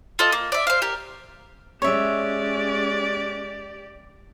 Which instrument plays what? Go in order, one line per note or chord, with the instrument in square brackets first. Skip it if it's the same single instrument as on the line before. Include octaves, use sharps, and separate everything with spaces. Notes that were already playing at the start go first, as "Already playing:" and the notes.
[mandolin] F4 A4 D#5
A#3
D5 E5
C5 F5
G4 A#4
[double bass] G#3 C#4 [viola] G4 D5 [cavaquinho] C#5 E5